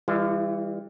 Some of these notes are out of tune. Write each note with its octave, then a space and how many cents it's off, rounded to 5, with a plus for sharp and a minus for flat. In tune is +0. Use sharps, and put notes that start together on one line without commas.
E3 +0 G3 +35 F4 -45